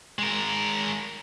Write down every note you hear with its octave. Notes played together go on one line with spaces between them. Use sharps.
G#3 A#4